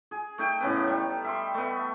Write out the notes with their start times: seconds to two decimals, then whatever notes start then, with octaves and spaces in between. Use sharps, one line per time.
0.11 G#4
0.38 A3 D#4 G5
0.61 A2 C#3 B3
0.88 G3
1.24 E5 C6
1.54 A3 B3